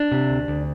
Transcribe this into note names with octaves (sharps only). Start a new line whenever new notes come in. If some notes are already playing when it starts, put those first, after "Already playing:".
Already playing: D4
C3
D2
D2